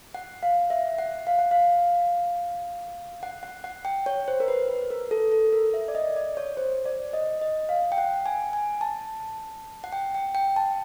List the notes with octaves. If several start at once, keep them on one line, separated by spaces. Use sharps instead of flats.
F#5
F5
E5
F#5
F5
F#5
F5
F#5
F#5
F#5
G5
C#5
C5
A#4
B4
B4
A#4
A4
A4
A#4
E5
D5
D#5
D5
C#5
C5
D5
D#5
D#5
F5
G5
F#5
G#5
G#5
A5
F#5
G5
G5
G5
A5